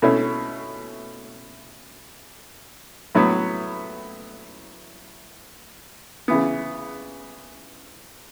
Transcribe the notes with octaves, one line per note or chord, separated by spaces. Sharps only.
B2 A3 C#4 E4
A2 F#3 B3
C#3 E3 B3